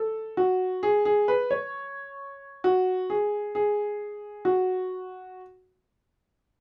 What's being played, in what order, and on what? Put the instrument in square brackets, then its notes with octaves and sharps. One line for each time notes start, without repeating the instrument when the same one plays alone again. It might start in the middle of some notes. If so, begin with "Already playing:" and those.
Already playing: [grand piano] A4
F#4
G#4
G#4
B4
C#5
F#4
G#4
G#4
F#4